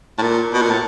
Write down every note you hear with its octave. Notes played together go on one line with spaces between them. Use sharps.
A2
A#2
B2
A#2
A2